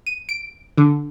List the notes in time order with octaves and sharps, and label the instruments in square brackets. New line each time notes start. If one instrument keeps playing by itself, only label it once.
[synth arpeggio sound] D#7
D7
D3